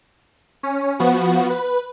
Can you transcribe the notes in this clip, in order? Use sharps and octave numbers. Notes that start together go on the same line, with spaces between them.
C#4
F3 B3 F#4
B4